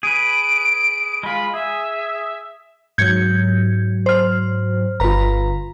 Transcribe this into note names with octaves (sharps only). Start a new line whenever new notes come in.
G#4 B4 D7
G#3 F4 B5
G#4 E5
G#2 F#3 G6 G#6 C#7
C5 F6
G1 F4 B4 A#5